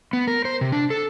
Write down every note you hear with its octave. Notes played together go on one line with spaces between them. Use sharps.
B3
A#4
C5
C3
D4
A4